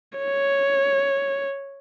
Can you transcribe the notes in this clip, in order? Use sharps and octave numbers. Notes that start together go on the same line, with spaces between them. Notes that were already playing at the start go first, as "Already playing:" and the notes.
C#5